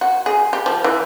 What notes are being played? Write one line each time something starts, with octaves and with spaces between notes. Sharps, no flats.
F#4
G#4
G4
F3
E3